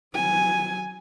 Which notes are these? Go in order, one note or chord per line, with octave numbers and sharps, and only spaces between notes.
F#3 G#5